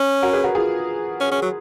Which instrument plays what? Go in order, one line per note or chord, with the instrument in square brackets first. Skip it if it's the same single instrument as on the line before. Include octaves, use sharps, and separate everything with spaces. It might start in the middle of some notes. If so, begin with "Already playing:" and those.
Already playing: [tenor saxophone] C#4
[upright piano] F#4 A#4
G#4 B4
F#4 A#4
F4 G#4
[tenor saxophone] C#4
C#4
F#3